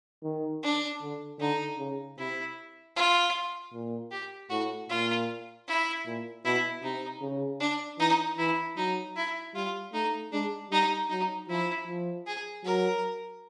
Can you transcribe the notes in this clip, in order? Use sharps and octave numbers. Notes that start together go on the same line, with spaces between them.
D#3
D4
D3
D3 D#4
C#3
C3 E4
F4
A#2
G4
A2 F#4
A#2 F4
E4
A#2
B2 E4
C3 D#4
C#3
D4
E3 D#4
E3 E4
F#3 D#4
E4
G3 F4
A3 D#4
G#3 D4
G3 D#4
F#3 D#4
F3 E4
F3
G#4
F#3 A#4